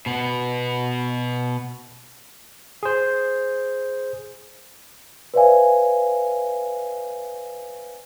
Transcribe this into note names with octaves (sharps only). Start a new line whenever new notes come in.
B2 B3
G#4 C5
B4 C5 D5 E5 F5 G#5